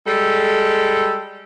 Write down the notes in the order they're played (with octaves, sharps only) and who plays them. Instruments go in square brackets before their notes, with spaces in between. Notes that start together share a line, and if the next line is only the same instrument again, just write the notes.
[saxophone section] G3 G#3 A4